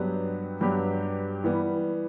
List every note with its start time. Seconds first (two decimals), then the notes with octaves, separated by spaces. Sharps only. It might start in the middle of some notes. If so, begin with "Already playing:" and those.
Already playing: G2 F#3 B3 D4 G4
0.61 G2 F#3 B3 D4 G4
1.44 E3 G3 B3